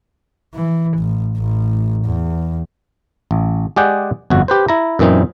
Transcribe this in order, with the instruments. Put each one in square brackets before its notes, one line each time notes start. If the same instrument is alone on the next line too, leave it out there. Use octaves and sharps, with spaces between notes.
[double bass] E3
A1
A1
E2
[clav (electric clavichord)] A1
G#3 G4 G#4 D5 F#5 G5
G1 F2 F#4
G4 B4 C5
E4 A#5
F#2 A#2 E3 C4 D#4